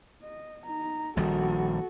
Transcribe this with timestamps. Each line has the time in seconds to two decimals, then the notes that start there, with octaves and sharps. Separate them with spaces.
0.22 D#5
0.66 D#4 A#5
1.17 A#1 D#3 G3 F#4 A4